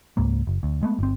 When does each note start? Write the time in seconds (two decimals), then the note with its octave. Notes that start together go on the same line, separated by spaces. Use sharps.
0.17 C#2 G#2 A#3
0.47 F#1
0.63 D2
0.83 G#3 A3 B3
0.99 G1 C4